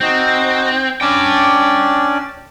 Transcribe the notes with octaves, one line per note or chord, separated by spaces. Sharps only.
C4 D#4 F#4
C#4 D4 D5 G5 A5